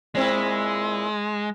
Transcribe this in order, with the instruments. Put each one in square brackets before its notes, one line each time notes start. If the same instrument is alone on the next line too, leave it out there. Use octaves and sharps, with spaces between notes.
[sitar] A#2 C4 E4 [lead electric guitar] G#3